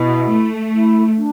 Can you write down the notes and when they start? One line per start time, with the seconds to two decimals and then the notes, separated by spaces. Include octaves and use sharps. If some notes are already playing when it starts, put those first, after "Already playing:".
Already playing: B2 E4
0.32 A3
0.74 E4
1.17 D4